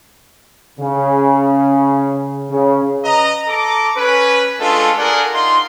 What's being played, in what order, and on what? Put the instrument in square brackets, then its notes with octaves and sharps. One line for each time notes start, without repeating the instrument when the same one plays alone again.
[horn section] C#3
C#3
[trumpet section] B4 D#5 A#5
A4 A#5 D6
C#4 B4
G#3 A3 D4 F4 A4
D4 G#4 A#4 D5 F#5
D#4 F4 C6